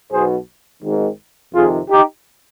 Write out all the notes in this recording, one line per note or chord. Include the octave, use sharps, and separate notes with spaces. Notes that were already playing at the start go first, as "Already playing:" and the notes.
B1 B2 G#4 C5
G#1 G#2 D#3
F2 C3 D#3 F4 G#4
D#4 G4